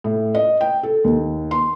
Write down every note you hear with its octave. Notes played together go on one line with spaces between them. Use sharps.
A2
D#5
G5
A4
D#2
C6